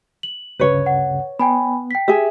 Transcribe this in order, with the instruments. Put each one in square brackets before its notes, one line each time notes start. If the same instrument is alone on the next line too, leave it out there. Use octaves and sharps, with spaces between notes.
[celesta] F#7
[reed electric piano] D2 G2 C#3 [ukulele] B4 C#5
[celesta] F#5
[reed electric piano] B3 [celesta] G5 G#5 B5
[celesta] G5 B6
[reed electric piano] G4 [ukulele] G#4 E5